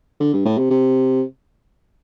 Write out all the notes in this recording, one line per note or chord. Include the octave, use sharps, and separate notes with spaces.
D3
G2
A2
C3
C3